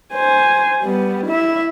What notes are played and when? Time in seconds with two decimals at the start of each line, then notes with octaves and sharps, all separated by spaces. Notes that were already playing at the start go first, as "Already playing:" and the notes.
0.14 C5 G#5
0.82 G3 B3
1.27 E4 E5